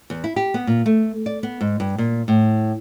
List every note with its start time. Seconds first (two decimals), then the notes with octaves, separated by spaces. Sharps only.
0.10 E2
0.24 E4
0.36 G4
0.54 B3
0.67 A#2
0.86 A3
1.26 D5
1.43 B3
1.61 G#2
1.80 G2
1.98 A#2
2.28 A2